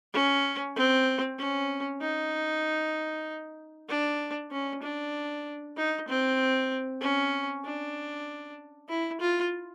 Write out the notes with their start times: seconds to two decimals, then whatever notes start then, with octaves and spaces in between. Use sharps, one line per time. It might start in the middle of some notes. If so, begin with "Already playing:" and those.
0.14 C#4
0.76 C4
1.39 C#4
2.01 D#4
3.89 D4
4.51 C#4
4.83 D4
5.77 D#4
6.08 C4
7.01 C#4
7.64 D4
8.89 E4
9.21 F4